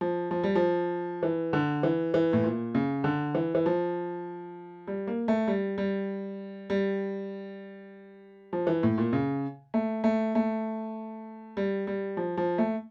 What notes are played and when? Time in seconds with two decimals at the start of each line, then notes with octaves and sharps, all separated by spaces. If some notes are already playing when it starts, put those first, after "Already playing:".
0.01 F3
0.31 F3
0.44 G3
0.55 F3
1.23 E3
1.53 D3
1.83 E3
2.14 E3
2.33 A2
2.44 A#2
2.75 C#3
3.04 D3
3.35 E3
3.55 E3
3.66 F3
4.87 G3
5.07 A#3
5.28 A3
5.48 G3
5.78 G3
6.70 G3
8.53 F3
8.67 E3
8.83 A2
8.98 A#2
9.13 C#3
9.74 A3
10.04 A3
10.35 A3
11.57 G3
11.87 G3
12.17 F3
12.37 F3
12.58 A3